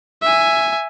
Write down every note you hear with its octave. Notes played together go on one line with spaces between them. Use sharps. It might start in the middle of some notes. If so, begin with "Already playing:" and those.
E5 G#5